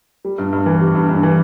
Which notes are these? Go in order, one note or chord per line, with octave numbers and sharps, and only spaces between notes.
G3
G2
G2
E3
G3
G2
G2
E3